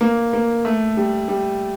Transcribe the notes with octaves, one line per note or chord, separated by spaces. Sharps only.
A#3
A#3
A3
G3
G3